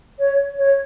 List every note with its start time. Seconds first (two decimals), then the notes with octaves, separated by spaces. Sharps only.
0.19 C#5
0.57 C#5